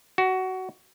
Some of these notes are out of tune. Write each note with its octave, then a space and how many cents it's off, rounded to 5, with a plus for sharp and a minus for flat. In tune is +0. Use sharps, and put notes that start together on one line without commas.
F#4 +15